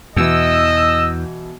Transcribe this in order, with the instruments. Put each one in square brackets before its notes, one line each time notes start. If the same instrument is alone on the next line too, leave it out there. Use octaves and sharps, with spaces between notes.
[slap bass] E2 [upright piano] B2 E3 [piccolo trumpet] D#5 [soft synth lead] E6